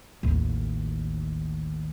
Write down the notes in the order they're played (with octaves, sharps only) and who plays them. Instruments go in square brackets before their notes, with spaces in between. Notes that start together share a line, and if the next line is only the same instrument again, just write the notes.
[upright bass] A1 D#2